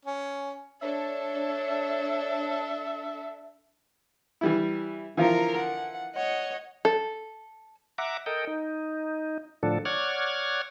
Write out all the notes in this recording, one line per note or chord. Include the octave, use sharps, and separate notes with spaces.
C#4
D4 A4 C#5 E5
E3 G3 E4
D3 E3 F3 F4 A#4 A#5
F#5
C#5 D#5 F#5
A4
E5 F#5 A#5 D6
A4 A#4 D#5 G5
D#4
A2 D3 F3 D4 A4
C#5 D5 F#5 F6 G#6